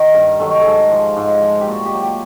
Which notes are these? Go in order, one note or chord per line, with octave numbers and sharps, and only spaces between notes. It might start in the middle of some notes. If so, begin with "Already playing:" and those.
Already playing: D#3
G2 A#4
D#3 F#3 A4
G#2 G#4 A4
F3
G#2
F3
G4
A#2 F#4
G4
F#3
G4